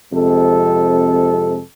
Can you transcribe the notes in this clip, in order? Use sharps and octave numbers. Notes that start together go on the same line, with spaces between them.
F2 C3 G#3 A4